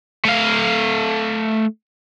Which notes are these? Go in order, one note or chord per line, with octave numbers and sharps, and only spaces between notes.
A3 F5